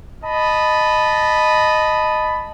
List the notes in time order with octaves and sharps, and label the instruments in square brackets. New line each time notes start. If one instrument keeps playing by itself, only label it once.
[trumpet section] D#5 A5 B5